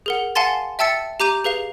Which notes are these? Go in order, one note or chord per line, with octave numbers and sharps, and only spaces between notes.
G#4 A#4 F#5
F5 F#5 G#5 A5 C6 A6
E5 G5 A5 E6 A6 C#7
G4 A#5 D6 G6 D#7 F7
G#4 B4 F5 F7